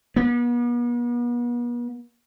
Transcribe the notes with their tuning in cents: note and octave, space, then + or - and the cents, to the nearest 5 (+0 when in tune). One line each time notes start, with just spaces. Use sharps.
B3 -40